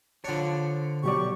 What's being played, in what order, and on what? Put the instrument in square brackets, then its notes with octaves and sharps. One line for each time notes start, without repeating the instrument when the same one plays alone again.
[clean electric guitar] D3 C#5 [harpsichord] F3 D4
[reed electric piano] B2 F#3 D5 [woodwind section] G4 C#6